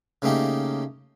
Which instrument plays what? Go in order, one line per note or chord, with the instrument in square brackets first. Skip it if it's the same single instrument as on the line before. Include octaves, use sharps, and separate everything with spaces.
[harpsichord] C#3 A3 A#3 D#4 G4